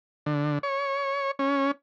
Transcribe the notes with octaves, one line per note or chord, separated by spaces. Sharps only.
D3
C#5
C#4